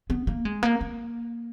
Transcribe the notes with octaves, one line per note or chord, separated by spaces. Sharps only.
B3
A#3
G#3
A#3
A#3